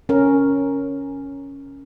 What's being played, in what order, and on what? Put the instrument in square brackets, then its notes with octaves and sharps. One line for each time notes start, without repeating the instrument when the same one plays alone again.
[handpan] C#4 A#4